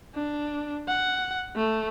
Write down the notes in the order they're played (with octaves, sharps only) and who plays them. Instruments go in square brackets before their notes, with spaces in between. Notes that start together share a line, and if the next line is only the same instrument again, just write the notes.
[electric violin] D4
F#5
A3